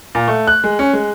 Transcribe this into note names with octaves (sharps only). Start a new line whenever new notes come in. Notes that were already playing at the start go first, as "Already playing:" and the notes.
A#2
A3
F#6
G#3
C#4
G#3